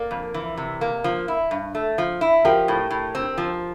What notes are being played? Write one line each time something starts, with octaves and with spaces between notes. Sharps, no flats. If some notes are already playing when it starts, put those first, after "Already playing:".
Already playing: A#3 A#4 D5
F2
E3
C3
A#3
F3
E4
G2
A3
F3
E4
F3 G4 A#4
A2
A2
C4
F3